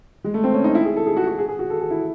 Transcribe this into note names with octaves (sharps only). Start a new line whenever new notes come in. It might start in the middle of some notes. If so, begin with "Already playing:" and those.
G#3
A3
C4
C#4
D#4
E4
G#4
A4
G#4
F#4
F#4
G#4
G#4
F#4
A4
G#4
E4